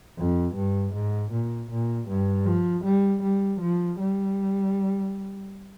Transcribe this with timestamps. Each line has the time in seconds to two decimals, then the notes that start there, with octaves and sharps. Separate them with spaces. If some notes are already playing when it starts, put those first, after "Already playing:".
0.17 F2
0.55 G2
0.94 G#2
1.32 A#2
1.70 A#2
2.08 G2
2.46 F3
2.84 G3
3.22 G3
3.61 F3
3.99 G3